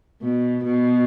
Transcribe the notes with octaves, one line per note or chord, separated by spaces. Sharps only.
B2
B2